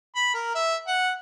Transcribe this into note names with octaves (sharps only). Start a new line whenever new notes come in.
B5
A#4
E5
F#5